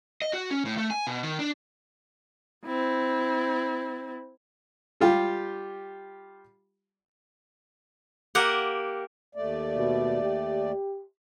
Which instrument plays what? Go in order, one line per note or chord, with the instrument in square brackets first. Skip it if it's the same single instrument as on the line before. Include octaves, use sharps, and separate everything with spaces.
[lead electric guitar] D#5
F#4
C#4
A2
A3
G#5
B2
D#3
D4
[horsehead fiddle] C4 E4
[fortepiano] G3 F4 G4
[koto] A#3 G4 A#4 F#5
[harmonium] D#2 A3 D5
[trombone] B2
G4